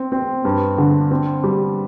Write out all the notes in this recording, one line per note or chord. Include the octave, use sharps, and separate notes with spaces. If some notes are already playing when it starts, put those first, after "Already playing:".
Already playing: C4
C4
G2
D3
C4
G3